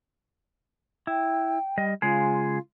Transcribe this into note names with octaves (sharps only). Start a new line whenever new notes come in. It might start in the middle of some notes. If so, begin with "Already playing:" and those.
E4 G5
G3 D#5
C#3 G#3 F4 G#4